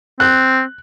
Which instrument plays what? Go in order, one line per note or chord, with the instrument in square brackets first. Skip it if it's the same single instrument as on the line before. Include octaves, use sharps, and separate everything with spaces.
[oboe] C4 [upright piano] F#6